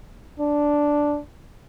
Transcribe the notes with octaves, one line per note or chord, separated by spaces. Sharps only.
D4